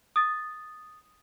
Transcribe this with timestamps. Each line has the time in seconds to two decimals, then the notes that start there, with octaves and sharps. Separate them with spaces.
0.16 D#6 A6